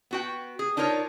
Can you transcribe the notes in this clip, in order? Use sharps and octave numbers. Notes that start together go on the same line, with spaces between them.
B3 F#4 G5
G#4
D4 D#4 F4 A#4 C#5